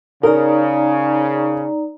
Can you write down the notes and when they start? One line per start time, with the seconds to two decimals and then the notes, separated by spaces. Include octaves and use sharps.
0.23 C#3 D#4 A#4 D5 A#5